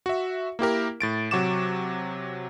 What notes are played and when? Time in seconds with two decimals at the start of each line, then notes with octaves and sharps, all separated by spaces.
0.06 F#4 E5
0.59 A#3 E4 G4 A#4
1.01 A2 A6 D7
1.31 C3 F#3 F#5 C#6 D6 E7